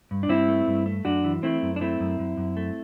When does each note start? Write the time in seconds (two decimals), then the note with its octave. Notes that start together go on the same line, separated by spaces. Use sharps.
0.11 G2
0.23 D4
0.29 G2 C4 E4
0.48 A3
0.67 G2
0.86 A3
1.05 F#2 D4 F#4
1.24 E3
1.43 A3 C4 E4
1.63 F#2
1.76 D4
1.81 A3 C4 E4
2.00 F#2
2.19 F#2
2.37 F#2
2.57 A3